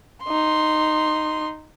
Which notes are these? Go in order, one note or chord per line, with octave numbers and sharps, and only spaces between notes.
D#4 C6